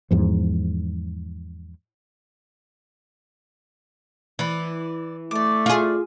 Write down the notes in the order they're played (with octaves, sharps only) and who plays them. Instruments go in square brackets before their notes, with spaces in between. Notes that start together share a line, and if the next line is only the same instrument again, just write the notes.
[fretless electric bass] E2 G#2 F3
[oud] E3 [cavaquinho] D5 B5
[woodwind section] A3 [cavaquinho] D5 D6
[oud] F4 G#4